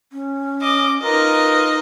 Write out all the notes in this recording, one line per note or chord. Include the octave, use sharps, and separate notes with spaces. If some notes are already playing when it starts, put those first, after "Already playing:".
C#4
D#5 D6
D#4 F4 A#4 B4 D#5